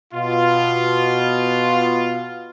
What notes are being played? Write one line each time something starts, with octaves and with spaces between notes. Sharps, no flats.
B2 F4